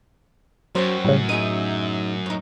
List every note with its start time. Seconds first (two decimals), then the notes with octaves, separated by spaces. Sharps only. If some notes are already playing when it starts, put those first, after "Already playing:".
0.75 F#2 F#3 C5 C#5 G5
1.05 A2 C#3 G3
1.29 D#4 G#4 E5 D#7
2.26 A2 D#4